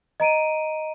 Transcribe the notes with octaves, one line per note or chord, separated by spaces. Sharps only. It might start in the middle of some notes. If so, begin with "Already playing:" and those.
D#5 A#5 D7 D#7